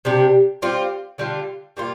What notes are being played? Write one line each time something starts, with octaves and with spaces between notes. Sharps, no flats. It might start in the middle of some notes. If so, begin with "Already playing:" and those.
C3 G3 D4 G4
G3 C4 F4
D3 G3 D4 F4
G3 A#3 F4